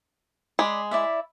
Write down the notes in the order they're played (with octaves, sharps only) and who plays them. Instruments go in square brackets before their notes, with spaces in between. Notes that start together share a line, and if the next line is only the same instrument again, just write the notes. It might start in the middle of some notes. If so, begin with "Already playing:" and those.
[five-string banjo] G#3 [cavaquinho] D5 B5
[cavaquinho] E4 D5 E5